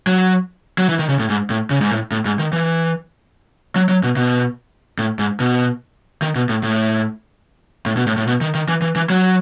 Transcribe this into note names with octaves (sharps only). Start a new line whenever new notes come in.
F#3
F#3
E3
D#3
C#3
A2
G#2
A2
C#3
G#2
A2
A2
G#2
D#3
E3
F#3
F#3
B2
B2
A2
G#2
B2
D#3
B2
A2
A2
A2
B2
A2
A2
B2
D#3
D#3
E3
E3
E3
F#3